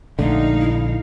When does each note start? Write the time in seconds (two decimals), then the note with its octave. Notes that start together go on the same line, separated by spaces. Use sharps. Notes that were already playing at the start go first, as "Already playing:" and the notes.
0.19 A#1 D3 A3 D#4 F5
0.61 E4